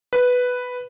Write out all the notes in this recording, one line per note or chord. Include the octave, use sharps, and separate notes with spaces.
B4